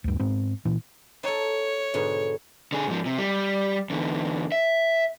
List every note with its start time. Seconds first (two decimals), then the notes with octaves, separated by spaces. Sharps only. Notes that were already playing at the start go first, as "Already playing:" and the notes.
0.04 D2 G2
0.19 G#2 B3 C4
0.65 A#2 E3
1.23 D#4 A4 C#5
1.94 G#2 B2 D3
2.72 D3 G#4
2.88 G#2 F3
3.06 C3
3.18 G3
3.90 E2 D3
4.52 E5